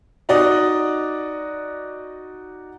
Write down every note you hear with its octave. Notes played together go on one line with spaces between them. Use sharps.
D#4 F#4 D5 D#5